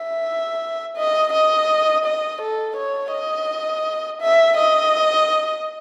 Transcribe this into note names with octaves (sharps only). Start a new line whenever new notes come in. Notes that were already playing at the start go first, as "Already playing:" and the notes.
Already playing: E5
D#5
D#5
D#5
A4
C#5
D#5
E5
D#5